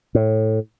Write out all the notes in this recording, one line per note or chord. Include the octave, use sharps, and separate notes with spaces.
A2